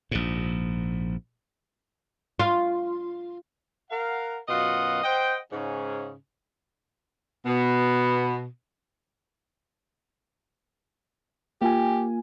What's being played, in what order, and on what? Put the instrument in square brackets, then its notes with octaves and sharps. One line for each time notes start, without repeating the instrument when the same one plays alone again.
[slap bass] A#1 G#2
[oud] F4
[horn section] A#4 F5 F#5
F#2 B2 F4 D#5 F5 F#5
C5 D#5 F#5 G5
G#2 C#3 C#4
[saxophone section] B2 B3
[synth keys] A#3 F4 G#5 [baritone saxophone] G4